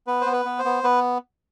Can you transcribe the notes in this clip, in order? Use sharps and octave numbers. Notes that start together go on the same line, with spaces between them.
B3 B4
C5
B3
B4
B3
C5
B3
B3 B4